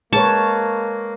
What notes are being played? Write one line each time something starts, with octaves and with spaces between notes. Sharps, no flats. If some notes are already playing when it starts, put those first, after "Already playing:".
G#3 A#3 G#4 B4 C#5 A5